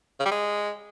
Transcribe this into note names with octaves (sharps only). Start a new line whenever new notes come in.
C#3
G3
G#3